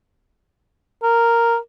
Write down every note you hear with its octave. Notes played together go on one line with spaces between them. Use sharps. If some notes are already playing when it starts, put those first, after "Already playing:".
A#4